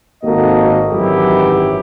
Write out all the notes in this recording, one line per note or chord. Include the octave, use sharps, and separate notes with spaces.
G#1 A#3 F#4 A4 D#5
G#1 F#2 E3 F#3 E4 G4